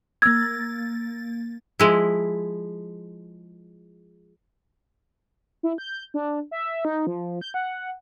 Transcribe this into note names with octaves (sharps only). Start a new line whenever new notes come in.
A#3 E6 G#6 A6
F3 G#3 E4
E4
G6
D4
E5
D#4
F3
G6
F#5